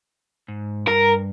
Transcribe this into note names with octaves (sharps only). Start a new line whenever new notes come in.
G#2
G2 A#4